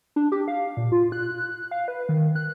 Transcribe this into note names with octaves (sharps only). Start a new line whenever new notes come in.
D4
G4
F5
A#2
F4
F#6
F#6
F5
B4
D#3
F#6